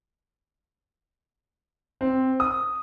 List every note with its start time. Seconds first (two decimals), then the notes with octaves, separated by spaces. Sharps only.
2.01 C4
2.40 D#6